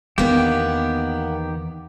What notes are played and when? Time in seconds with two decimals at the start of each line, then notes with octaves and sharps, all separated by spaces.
0.18 E2 D#3 A#3 B3 D4 G4